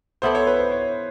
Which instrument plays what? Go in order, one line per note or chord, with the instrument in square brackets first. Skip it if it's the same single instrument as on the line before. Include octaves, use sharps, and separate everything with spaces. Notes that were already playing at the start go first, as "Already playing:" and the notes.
[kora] B3 E4 A4 D5 [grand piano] C5
[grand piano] C#5
B4
C5
C#5